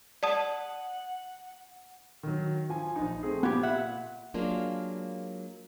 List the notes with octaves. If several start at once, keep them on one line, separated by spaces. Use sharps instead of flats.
D5 F#5 A5 D#6
D#3 F#3
F3 G#5
A#1 D#4
A3 C4 G#4
A#2 B3 G4 G#6
E5 F#5
F#3 G#3 A#3 D4 F4